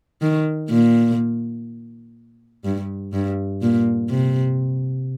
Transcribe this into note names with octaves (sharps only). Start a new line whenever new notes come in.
D#3
A#2
G2
G2
A#2
C3